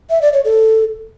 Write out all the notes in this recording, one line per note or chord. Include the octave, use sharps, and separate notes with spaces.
E5
D5
C#5
A4